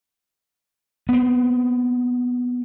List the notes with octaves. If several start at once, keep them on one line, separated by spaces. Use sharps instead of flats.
B3 C4